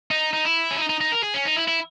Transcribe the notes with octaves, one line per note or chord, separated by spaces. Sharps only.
D#4
D#4
E4
C#4
D#4
D#4
D#4
A#4
G#4
C#4
D#4
E4
E4